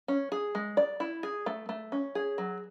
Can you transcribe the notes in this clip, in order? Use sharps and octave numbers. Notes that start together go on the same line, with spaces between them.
C#4
G#4
G#3
D5
E4
G#4
A3
A3
C#4
G#4
F#3